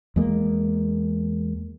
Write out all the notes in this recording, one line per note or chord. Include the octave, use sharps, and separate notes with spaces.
E2 G#3 A#3